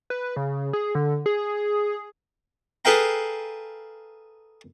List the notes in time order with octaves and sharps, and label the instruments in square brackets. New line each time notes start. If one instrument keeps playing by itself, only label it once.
[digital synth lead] B4
C#3
G#4
D3
G#4
[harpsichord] G#4 A4 B4 F5 G5 A#5